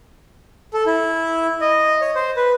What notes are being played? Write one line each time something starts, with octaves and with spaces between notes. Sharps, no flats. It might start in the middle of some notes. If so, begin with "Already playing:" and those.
A4
E4
D#5
C#5
C5
B4